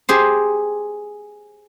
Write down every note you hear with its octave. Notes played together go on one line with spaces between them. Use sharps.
G4 G#4 C5